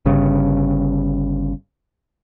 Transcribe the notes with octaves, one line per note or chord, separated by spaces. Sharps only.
G1 G2 C#3